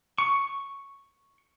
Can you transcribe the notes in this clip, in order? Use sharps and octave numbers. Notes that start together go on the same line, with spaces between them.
C#6